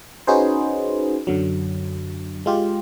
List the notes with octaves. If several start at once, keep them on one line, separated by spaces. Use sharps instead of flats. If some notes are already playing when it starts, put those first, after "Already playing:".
C#4 D#4 F#4 G#4 B4 C5
F#2 D3 F#3
G#3 F4 G4